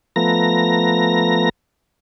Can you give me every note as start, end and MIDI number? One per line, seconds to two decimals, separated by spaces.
0.16 1.49 53
0.16 1.49 57
0.16 1.49 59
0.16 1.49 82
0.16 1.49 94